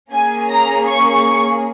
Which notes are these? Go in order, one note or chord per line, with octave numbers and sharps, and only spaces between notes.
A#3 C#4 G#4 G#5
A#5
C#6